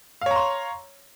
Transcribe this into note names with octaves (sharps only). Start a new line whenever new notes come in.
C#5 F5 A#5 C6